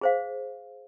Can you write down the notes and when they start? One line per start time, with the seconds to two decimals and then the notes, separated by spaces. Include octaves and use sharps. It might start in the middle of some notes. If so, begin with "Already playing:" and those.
0.01 G#4 C5 F5